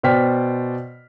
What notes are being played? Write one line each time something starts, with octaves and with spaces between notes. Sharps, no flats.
B2 C5 D5 G5 F6 B6